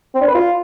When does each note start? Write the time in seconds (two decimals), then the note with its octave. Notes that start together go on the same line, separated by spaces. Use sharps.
0.15 C4
0.21 D4
0.28 B4
0.35 F4